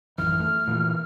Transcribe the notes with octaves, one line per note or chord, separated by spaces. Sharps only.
A1 F#2 E3 F6
A3
A#2 E3